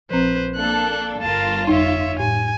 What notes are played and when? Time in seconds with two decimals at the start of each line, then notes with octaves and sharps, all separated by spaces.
0.10 A#1 F3 C4 B4 C5
0.55 A#3 D4 A4 F#6
1.22 G1 F4 A#4 A5
1.67 F2 D#4 C#5 E5
2.20 A2 G#5